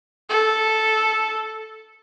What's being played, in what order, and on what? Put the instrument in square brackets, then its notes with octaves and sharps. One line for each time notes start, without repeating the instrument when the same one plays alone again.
[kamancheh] A4